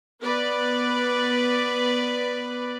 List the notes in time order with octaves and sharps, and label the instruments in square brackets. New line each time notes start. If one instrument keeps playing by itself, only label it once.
[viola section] B3 B4 D5